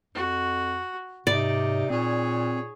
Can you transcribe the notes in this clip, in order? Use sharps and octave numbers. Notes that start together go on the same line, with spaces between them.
F2 F#4
G#2 C3 D#4 D5 D6
A#2 C4 G#4 C#5